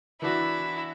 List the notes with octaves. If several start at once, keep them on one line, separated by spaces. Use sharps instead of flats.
E3 B3 D4 E4 F#4